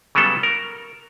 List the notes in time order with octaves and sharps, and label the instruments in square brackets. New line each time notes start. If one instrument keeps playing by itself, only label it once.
[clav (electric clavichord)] C#3 F#3 G3 B3 A4
A#4